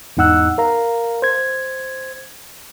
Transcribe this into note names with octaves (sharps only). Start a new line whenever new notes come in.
E2 G#2 D#4 F#5 E6 F#6
A#4 F5 A#5
C5 G#6